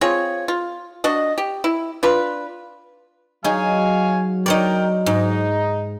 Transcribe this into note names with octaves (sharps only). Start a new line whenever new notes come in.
C4 F4 G#4 C#5
F4
D4 F#4 D#5
G4
E4
D4 F4 B4
F#3 D#4 G#4 C#5 F5 G#5
D#4 A#4 C#5 D5 G5
G#2 D#4